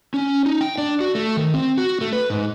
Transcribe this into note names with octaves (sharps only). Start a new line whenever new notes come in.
C#4
D#4
G5
D4
F#4
A3
D#3
C4
F#4
A3
B4
G#2